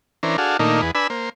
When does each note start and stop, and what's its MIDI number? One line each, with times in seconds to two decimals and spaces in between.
0.23 0.37 52
0.23 0.37 61
0.23 0.37 62
0.23 0.37 70
0.23 0.37 72
0.38 0.57 62
0.38 0.57 66
0.38 0.57 68
0.38 0.57 69
0.38 0.57 77
0.59 0.81 46
0.59 0.81 51
0.59 0.81 57
0.59 0.81 58
0.59 0.81 62
0.59 0.81 63
0.82 0.91 40
0.82 0.91 68
0.82 0.91 71
0.95 1.07 62
0.95 1.07 71
0.95 1.07 80
0.95 1.07 83
0.95 1.07 88
1.10 1.29 58
1.10 1.29 72